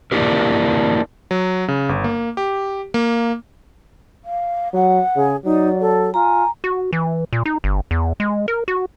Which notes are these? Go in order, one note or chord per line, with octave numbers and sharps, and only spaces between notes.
A#3 D4 E4 G4 A#4
F#3
C#3
G1
A#3
G4
A#3
F5
F#3 F#5
C#3 G#4
F#3 D#4 D5
A4
F4 G#5 A#5
F#4
E3
A#2
D#4
G1
E2
G#3
A#4
F#4